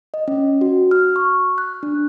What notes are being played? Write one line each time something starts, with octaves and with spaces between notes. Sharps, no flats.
D#5
C#4
F#4
F6
C#6
F#6
D4